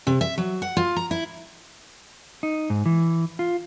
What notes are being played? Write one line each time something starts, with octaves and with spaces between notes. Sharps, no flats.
C3
E5
F#3
F#5
F4
A#5
E4
D#4
G#2
E3
F4